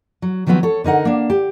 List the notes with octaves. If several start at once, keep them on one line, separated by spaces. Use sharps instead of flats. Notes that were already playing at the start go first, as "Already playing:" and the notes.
F#3
D#3 F3 F#3 B3 C4
A4 C#5
D3 D#4 A#4 F#5
A#3 D4
G4